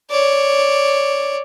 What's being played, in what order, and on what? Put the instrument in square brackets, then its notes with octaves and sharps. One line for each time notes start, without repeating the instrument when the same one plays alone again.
[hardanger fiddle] C#5 D5